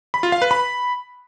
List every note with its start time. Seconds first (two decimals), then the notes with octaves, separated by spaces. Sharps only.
0.14 B5
0.23 F4
0.32 F5
0.42 B4
0.51 B5